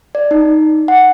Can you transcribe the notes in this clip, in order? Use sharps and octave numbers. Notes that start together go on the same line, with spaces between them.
D5
D#4
F#5